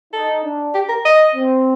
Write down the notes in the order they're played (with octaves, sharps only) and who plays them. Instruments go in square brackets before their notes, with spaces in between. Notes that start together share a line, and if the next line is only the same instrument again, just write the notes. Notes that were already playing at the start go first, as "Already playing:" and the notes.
[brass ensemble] D#4 [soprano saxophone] A4
[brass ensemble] D4
[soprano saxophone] G4
A#4
D#5
[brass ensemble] C4